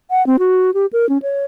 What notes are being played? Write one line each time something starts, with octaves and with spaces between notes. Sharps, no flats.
F#5
C4
F#4
G4
A#4
C#4
C#5